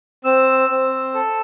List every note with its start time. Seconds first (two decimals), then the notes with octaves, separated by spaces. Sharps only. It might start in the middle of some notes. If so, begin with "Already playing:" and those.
0.25 C4 E6
0.70 C4
1.14 A4